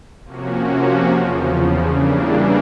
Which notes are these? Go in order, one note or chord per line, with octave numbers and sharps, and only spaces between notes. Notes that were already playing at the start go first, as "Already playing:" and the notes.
C3 F3 A#3 C#4 F#4
E2 C#3 F3
C#3 E3 G3 A#3 D4